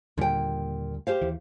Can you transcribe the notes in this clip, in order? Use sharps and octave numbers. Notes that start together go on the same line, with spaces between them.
D#2 A#2 D3 G3 G5
G4 C5 F5
D#2 E3